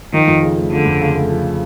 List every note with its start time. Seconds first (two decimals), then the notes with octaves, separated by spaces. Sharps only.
0.13 D#3 F3
0.27 F2
0.42 C#3
0.57 A3
0.72 D3 F3
0.86 F2
1.01 C#3
1.15 A3
1.30 F3